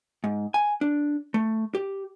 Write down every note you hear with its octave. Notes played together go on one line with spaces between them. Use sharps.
G#2
G#5
D4
A3
G4